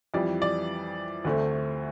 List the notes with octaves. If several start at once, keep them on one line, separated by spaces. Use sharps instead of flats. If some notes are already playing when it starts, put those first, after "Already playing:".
F2 E3 G3 D5
D5
D2 D3 A3 C4